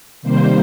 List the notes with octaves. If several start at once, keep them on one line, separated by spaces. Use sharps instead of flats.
C3 D#3 G3 A#3 C5